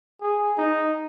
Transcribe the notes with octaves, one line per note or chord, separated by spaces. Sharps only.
G#4
D#4